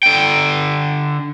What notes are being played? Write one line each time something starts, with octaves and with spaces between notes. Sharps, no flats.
D3 G5